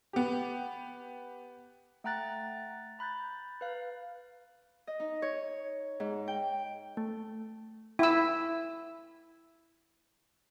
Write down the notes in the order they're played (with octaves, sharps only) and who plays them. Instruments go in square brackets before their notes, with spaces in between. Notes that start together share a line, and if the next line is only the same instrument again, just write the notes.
[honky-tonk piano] B3 G4
[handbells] A3 F#5 G5 A#5 F#6 A6
A#5 B5 F#6 G6 A6
B4 F5
[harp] D#5
D#4
C#5
G#2
G5
[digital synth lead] A3
[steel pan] E4 E6